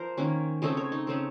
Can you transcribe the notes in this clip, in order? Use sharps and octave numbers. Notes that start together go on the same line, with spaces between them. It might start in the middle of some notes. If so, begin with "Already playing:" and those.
Already playing: F3 A#4 C5
D#3 A#3 C#4
C#3 A3 C4 D#5
C#5
D#4
C#3 A3 C4